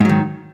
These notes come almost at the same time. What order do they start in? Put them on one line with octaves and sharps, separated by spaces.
G#2 F#3 D#3